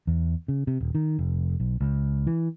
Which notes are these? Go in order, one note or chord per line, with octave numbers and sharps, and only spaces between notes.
E2
C#3
C3
D#1
D#3
F1
B1
C#2
E3